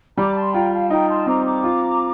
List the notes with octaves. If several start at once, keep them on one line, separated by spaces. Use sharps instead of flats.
G3 A#5 D6
A5 C6
F4 G5 A#5
F5 A5
D#4 G5 A#5
A5 C6
C4 A#5 D6
A#5 D6
F4